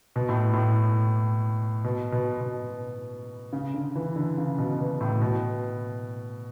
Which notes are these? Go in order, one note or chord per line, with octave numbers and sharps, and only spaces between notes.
B2
A2
A2
B2
B2
B2
C#3
D3
E3
D3
C#3
B2
B2
A2
B2